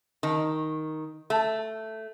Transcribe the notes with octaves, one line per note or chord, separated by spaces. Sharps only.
D#3
A3